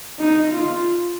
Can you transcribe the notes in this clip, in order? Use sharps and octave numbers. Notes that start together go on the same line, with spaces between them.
D#4
F4